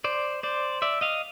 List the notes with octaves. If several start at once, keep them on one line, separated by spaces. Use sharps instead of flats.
C5 D5
C5 D5
D5 E5
D#5 F5